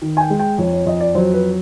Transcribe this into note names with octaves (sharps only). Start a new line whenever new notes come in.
D#3
G#5
G5
G#3
G5
F2 C#5
C#5
F2 D#5
D5
F#3 C5
B4